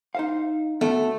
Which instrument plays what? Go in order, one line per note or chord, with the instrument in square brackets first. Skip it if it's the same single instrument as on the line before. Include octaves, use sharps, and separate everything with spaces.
[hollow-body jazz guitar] D#4 C5 F5
[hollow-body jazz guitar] D2 B3 [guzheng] A3